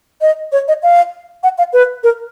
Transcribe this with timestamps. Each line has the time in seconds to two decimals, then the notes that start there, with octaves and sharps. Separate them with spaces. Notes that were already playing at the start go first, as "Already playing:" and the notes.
0.21 D#5
0.52 C#5
0.68 D#5
0.83 F5
1.43 F#5
1.58 F5
1.73 B4
2.04 A#4